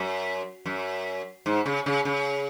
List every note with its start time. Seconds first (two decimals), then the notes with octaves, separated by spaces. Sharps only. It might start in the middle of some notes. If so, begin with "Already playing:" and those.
Already playing: F#2
0.66 F#2
1.46 G#2
1.66 C#3
1.86 C#3
2.05 C#3